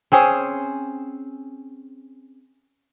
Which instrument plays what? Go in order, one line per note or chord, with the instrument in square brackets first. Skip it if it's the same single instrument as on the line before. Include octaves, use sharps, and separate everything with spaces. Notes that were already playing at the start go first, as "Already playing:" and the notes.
[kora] C4 C#4 G#4 C5